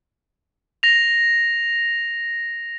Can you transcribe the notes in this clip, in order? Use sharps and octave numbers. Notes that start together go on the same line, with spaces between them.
A#6 F7